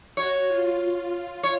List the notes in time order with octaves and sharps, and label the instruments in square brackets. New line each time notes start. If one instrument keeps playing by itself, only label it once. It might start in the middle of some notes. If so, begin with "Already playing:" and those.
[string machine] F#4 [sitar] C#5
[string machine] F4
F4
[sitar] C#5